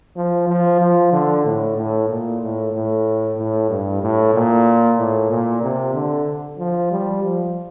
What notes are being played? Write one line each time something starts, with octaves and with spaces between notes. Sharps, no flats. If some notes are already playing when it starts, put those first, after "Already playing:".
F3
F3
F3
D3
A2
A2
A#2
A2
A2
A2
G2
A2
A#2
A2
A#2
C3
D3
F3
G3
F3